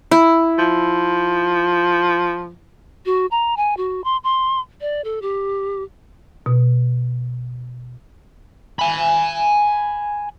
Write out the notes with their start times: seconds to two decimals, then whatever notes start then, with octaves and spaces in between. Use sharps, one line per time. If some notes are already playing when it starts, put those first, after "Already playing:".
0.11 E4
0.58 F3
3.06 F#4
3.31 A#5
3.57 G#5
3.77 F#4
4.04 C6
4.24 C6
4.81 D5
5.04 A4
5.22 G4
6.46 B2
8.79 G#5 B5